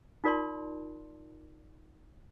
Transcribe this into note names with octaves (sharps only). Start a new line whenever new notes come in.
D#4 F4 A#4 D5 A5 C6